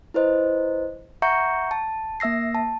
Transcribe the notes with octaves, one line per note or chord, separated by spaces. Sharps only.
E4 B4 C5 D#5
E5 F#5 A#5 C#6 G6 C#7
A5
A#3 E5 E6 A#6 C7
A5